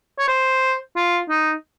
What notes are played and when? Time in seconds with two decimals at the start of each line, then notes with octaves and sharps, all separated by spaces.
0.19 C#5
0.27 C5
0.96 F4
1.29 D#4